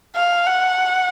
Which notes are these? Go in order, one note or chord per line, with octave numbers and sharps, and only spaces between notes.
F5
F#5